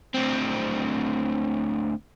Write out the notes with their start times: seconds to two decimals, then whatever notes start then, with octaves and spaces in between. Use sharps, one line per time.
0.14 D2 C4